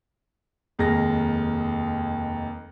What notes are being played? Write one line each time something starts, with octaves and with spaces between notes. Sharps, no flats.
F1 D#2 G#3 G#4 A#4 A#6